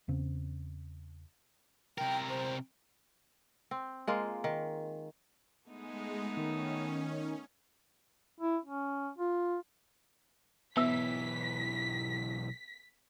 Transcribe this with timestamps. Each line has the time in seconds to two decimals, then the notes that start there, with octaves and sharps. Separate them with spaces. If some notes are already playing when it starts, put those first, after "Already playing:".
0.08 E2 C#3 C4
1.98 C3 A#4 G5
2.29 C5
3.71 C4
4.07 G#3 A#3 F4
4.44 D#3
5.68 G#3 A3 B3 D#4
6.37 D#3 C#4
8.40 E4
8.65 C#4
9.18 F4
10.77 B1 E3 B3 E5 E6 B6